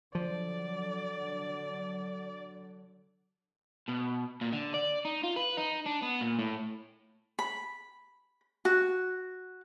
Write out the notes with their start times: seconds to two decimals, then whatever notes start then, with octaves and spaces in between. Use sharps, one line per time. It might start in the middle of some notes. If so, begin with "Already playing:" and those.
0.15 D3 F3 F#3 D5
3.89 B2
4.41 A#2
4.53 D3
4.74 D5
5.05 D#4
5.23 F4
5.36 B4
5.57 D#4
5.86 D4
6.03 B3
6.21 A#2
6.39 A2
7.39 B5
8.65 F#4